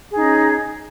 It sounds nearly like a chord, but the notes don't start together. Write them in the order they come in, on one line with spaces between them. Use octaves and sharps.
G#4 D#4 C#4